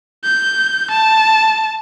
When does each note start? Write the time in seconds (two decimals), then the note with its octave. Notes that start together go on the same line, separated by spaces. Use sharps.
0.24 G6
0.91 A5